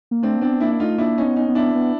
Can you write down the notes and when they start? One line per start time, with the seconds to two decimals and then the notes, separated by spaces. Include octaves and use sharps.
0.11 A#3
0.23 A3 C4 D4
0.37 A#3
0.41 B3 C4 D4
0.60 A#3 D4 E4
0.72 E4
0.80 A3 D#4 F4
0.98 A#3 D4 E4
1.18 C#4 D#4
1.24 B3
1.36 C#4 D#4
1.49 B3
1.55 D4 E4
1.75 B3